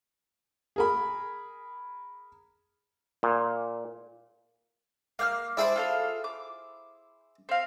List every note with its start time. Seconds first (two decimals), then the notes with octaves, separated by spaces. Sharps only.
0.76 G#4 A#4 B5
3.23 A#2
5.19 A#3 F5 G5 F6
5.57 E4 G#4 C5 D5 A5
5.76 F4 A4 F5
6.24 D6
7.49 C4 F5